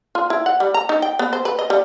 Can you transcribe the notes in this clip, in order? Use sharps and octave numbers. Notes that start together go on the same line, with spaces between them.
F4
E4
F#5
G3
A#5
D#4
G5
B3
C5
B4
D#5
G3